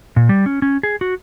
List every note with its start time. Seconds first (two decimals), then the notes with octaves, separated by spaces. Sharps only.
0.16 A#2
0.29 G3
0.46 C#4
0.62 C#4
0.83 G#4
1.01 F#4